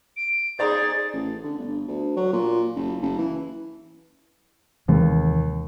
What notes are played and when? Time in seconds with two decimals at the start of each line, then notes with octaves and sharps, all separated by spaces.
0.17 D7
0.59 D#4 G#4 C5 D5 A#5 A6
1.13 A1
1.43 D3
1.58 G1
1.88 D2
2.16 F#3
2.33 A#2
2.75 F#1
3.02 F#1
3.18 E3
4.88 D#2 C3 E3 G#3